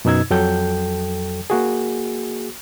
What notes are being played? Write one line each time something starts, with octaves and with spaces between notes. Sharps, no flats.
F#2 B2 D#4 E6 G#6
F2 F#3 A4 G5 G6
A#3 F#4 G#4